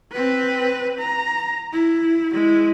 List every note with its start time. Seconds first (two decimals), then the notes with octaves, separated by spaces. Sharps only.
0.12 C4 B4
0.99 A#5
1.73 E4
2.32 G#3 E4